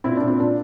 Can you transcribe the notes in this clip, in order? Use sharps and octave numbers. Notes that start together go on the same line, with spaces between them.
A#2 C4 E4
A#2 D4
C4
A#2 D4